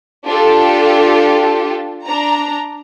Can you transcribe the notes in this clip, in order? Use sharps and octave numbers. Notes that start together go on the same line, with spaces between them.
D4 F4 G4 A4
D4 A#5